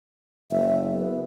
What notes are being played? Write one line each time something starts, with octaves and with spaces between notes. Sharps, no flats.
F#1 E5
B3